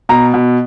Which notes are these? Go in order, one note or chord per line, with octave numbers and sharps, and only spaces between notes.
B2 A#5
B2